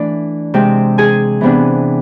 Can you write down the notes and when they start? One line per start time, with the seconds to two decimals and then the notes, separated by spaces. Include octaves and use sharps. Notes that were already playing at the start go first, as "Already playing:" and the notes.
Already playing: E3 A3 D4 E4 D5
0.54 C3 G#3 C4
0.98 G#4 G#5
1.41 C3 E3 B3 D4